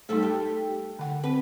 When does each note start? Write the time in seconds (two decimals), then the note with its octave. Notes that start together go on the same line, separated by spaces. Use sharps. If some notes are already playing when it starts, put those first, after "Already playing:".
0.09 G3 A3 D#4 A4 E5
0.23 G4 A4
0.99 D3 F#5
1.24 C4 B4